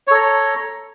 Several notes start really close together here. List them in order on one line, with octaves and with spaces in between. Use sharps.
C#5 A4 A#5